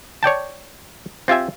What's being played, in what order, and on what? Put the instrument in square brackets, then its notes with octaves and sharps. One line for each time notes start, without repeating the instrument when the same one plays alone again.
[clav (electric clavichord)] C#5 D5 G5 A5
C4 F4 G4 E5 G#5